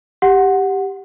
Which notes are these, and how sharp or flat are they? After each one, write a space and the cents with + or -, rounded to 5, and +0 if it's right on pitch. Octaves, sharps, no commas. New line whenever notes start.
G4 +0 F#5 -5